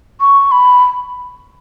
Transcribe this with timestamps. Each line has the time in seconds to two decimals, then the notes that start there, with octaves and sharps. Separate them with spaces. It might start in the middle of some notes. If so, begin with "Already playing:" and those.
0.21 C#6
0.52 B5